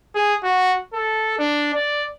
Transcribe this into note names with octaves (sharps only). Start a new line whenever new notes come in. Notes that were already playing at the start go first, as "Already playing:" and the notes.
G#4
F#4
A4
D4
D5